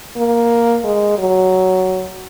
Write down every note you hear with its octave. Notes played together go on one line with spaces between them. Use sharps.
A#3
G#3
F#3